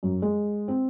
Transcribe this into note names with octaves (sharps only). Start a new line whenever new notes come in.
F#2
G#3
C4